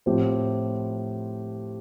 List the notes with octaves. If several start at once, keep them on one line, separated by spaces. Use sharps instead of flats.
A2 F3 C4 G4 C5